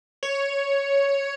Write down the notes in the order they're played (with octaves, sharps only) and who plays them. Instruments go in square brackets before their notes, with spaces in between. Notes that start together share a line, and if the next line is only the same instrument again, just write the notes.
[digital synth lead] C#5